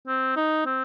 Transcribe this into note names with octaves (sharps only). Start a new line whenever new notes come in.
C4
D#4
C4